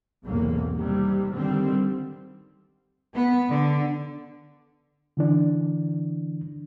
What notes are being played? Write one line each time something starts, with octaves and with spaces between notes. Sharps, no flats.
B1 E2 G#2 C3 A#3
C3 D#3 G3
D3 D#3 G3 C4
B3
D3
D3 E3 D4